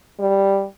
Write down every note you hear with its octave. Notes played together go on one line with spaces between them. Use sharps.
G3